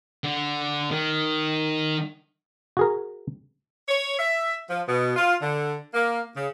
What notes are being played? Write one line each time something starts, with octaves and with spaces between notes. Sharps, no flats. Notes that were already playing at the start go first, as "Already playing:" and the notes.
D3
D#3
F#4 G#4 A#4
C#5
E5
F3
B2
F4
D3
A#3
C#3